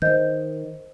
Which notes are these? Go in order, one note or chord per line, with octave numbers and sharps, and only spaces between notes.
D#3 C5 D#5 G6